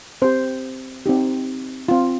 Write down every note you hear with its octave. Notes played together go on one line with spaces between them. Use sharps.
C4 G4 C5
C4 D#4 G4
C4 F4